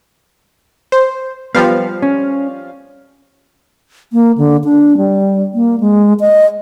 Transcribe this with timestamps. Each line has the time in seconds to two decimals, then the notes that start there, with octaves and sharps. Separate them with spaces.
0.92 C5
1.55 F3 G3 B3 F5
2.02 C#4
4.13 A#3
4.38 D3
4.64 D4
4.97 G3
5.54 A#3
5.80 G#3
6.20 D#5